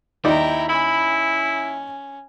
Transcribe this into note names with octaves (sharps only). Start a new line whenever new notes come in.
D#2 D#4 E4 D5 G5 A#5
C#4 E4 B5